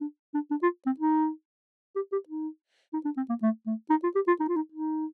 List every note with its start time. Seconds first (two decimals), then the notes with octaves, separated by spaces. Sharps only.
0.01 D4
0.34 D4
0.51 D4
0.63 F4
0.86 C4
1.00 D#4
1.96 G4
2.12 G4
2.29 D#4
2.94 D#4
3.05 D4
3.17 C4
3.29 A#3
3.42 A3
3.67 A3
3.90 D#4
4.03 F4
4.15 G4
4.28 F4
4.40 D#4
4.49 F4
4.56 D#4
4.72 D#4